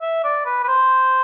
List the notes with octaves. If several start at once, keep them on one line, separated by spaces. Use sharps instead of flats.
E5
D5
B4
B4
C5